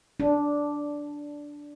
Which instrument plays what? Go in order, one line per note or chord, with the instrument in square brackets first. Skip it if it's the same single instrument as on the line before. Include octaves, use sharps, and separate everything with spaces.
[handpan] D4